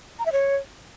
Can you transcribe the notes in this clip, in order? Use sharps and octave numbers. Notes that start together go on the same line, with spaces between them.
A#5
E5
C#5